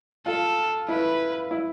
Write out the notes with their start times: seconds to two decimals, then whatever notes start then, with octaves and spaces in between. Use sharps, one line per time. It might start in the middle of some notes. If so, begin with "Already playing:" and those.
0.26 F4 A4
0.88 E4 B4
1.51 E4